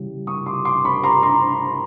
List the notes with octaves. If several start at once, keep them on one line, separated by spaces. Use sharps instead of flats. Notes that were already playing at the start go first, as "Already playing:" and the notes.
Already playing: C#3 E3 G3
C#6 D#6
C6 D6
C6 D6
B5 C#6
A#5 C6
A#5 C6